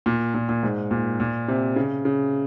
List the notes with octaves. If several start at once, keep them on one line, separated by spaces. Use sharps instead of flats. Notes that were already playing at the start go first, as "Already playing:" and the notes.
A#2
A#2
A#2
G#2
A#2
A#2
C3
C#3
C#3